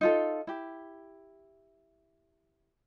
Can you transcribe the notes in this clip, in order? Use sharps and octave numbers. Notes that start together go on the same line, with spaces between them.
D#4 F4 A4
E4 G4